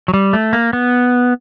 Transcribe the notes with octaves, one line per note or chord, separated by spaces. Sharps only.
F#3
G3
A3
A#3
B3